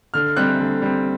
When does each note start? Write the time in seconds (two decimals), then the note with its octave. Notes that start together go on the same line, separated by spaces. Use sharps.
0.14 D3 F6
0.36 G3 C4 F#6
0.60 D3
0.82 G3 C4